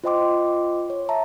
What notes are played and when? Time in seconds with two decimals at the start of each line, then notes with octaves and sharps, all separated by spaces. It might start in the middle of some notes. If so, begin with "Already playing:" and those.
0.04 F4 C5 D#5 G5 C6 D6
0.90 C#5
1.09 E5 A5 A#5